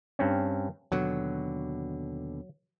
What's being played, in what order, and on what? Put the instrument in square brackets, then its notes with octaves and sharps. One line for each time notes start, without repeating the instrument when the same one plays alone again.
[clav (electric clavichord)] G2 C4 C#4
[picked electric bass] D#2 B2 D3 [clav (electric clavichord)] F#3